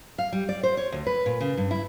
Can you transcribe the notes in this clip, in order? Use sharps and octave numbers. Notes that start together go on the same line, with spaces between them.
F5
G3
D5
C5
C#5
D2
B4
A#2
C#3
G2
E4